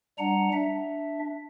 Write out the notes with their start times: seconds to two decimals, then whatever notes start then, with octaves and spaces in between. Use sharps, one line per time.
0.18 G3 D4 F#5 A#5
0.53 D4 E5